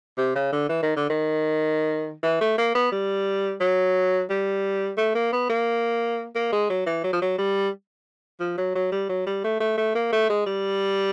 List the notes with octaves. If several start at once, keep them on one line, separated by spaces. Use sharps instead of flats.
C3
C#3
D3
E3
D#3
D3
D#3
E3
A3
A#3
B3
G3
F#3
G3
A3
A#3
B3
A#3
A#3
G#3
F#3
E3
F#3
F3
F#3
G3
F3
F#3
F#3
G3
F#3
G3
A3
A3
A3
A#3
A3
G#3
G3